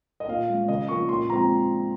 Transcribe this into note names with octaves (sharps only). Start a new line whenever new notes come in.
D#5
A#2 F5
G#3 C#4
C#3 D#5
F3 A#3 C#4 C#6
A#2 C6
F3 G#3 C4 A#5